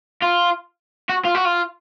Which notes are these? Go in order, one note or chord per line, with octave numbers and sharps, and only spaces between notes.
F4
F#4
F4
F#4
F4